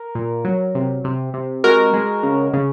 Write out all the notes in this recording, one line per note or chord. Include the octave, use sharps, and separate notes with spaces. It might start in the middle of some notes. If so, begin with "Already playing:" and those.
Already playing: A#4
A#2
F#3
C3
C3
C3
G#3 F#4 A#4
G#3
C#3
C#3